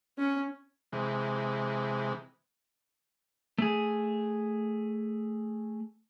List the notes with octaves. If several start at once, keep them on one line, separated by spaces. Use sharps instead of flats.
C#4
C3 E3 G#3
A3 G#4